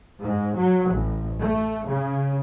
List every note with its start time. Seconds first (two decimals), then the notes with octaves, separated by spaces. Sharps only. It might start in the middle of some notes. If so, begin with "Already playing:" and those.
0.21 G#2
0.56 F#3
0.92 A1
1.40 A3
1.88 C#3